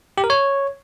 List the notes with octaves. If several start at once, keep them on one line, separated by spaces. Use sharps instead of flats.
G4
A#4
C#5